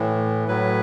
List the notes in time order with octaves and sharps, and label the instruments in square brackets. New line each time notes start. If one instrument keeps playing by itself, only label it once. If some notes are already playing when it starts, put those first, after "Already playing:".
Already playing: [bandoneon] A2 E3
A2 F#3 B4